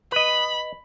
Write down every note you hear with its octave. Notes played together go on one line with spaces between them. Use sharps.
B4 D#5 B5